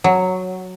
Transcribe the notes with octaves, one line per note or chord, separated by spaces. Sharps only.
F#3